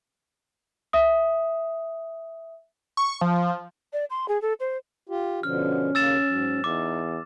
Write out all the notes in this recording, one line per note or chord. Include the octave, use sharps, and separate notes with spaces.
E5 D#6
C#6
F3
D5
C6
G#4
A4
C5
F4 G4
B2 D3 F3 C#4 F6
D#2 C#3 A#3 E6 A6 E7
G#2 F#3
E2 D#4 D6